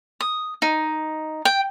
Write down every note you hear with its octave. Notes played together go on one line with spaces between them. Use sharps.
D#6
D#4
G5